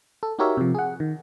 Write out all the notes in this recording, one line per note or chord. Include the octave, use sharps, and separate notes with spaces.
A4
D#4 F#4 G4 A#4 C#5 E5
C3 F3
G#4 F#5
D#3